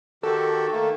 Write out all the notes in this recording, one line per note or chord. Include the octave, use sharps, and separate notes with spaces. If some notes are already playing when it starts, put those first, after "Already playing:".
D#3 F#4 G4 A4
D#3 A3 A#3